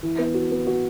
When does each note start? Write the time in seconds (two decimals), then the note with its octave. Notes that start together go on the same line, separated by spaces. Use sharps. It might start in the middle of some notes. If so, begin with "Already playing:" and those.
0.03 E3
0.18 B3
0.34 F#4
0.51 B3
0.67 F#4